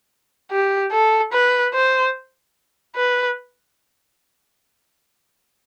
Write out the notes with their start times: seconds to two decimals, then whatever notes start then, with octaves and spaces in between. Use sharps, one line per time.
0.51 G4
0.92 A4
1.33 B4
1.74 C5
2.96 B4